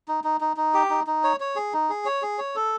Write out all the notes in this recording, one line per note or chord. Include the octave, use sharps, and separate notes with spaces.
D#4
D#4
D#4
D#4
G4
D#4
D#4
C#5
C#5
G#4
D#4
G#4
C#5
G#4
C#5
A4